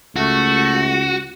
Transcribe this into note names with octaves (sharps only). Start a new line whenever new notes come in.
C#2 A3 F#4